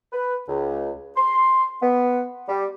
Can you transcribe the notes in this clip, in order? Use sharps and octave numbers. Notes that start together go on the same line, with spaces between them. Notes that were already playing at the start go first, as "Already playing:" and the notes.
B4
C#2
C6
B3
G3